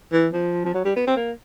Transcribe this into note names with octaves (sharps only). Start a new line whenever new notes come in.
E3
F3
F3
F#3
G3
B3
C4
A#3